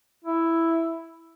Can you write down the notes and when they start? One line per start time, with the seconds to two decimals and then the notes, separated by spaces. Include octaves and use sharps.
0.24 E4